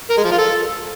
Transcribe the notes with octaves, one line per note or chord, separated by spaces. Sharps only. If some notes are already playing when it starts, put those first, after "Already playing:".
A#4
G#3
F3
F4
A4